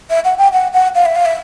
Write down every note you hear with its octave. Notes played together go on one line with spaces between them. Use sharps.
E5
F#5
G5
F#5
F#5
F5
E5
F5
E5